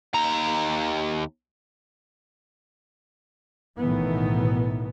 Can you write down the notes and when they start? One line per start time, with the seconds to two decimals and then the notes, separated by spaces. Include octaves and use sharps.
0.14 D#2 A#5
3.78 B1 A2 D#3 E3 B3